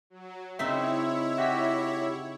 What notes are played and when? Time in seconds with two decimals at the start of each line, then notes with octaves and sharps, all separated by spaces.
0.10 F#3
0.59 C#3 C4 D#4 E4 C#5 E5
1.38 F#4 G4 B6